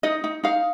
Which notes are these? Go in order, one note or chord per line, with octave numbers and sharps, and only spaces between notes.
D#4 D#5
D#4
D#4 F5